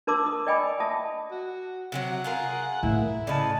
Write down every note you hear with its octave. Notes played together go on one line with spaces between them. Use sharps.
D4 A#4 A5 C6 D6 E6
D#6
D5 D#5 G5 G#5 B5 D6
E5 A5 D#6
F#4
C3 F3 F#3 F#5
F4 G#4 A#4
A2 E4
C#3 B4 D5 D#5 A5